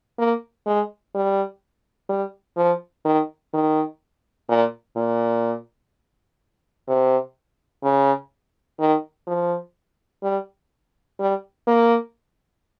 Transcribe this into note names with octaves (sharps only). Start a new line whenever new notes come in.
A#3
G#3
G3
G3
F3
D#3
D#3
A#2
A#2
C3
C#3
D#3
F3
G3
G3
A#3